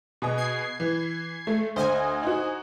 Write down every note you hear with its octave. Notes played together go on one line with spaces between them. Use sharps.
B2 G#4 D#5
G#6 C7
E3
G#3 A3
D2 C5 D#5 G#5
D#4 F#4